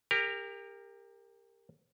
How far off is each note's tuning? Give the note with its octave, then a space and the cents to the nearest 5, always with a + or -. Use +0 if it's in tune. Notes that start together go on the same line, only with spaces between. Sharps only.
G4 +30 A#4 -10